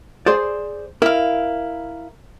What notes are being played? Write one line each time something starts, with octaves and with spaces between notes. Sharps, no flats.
G#4 C5 D5
E4 A#4 F5